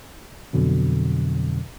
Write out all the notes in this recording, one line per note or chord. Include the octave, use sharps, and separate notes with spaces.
F2 B2 D3 F#3